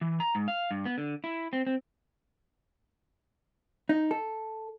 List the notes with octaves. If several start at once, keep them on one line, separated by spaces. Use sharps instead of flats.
E3
A#5
G#2
F5
G2
B3
D3
E4
C4
C4
D#4
A4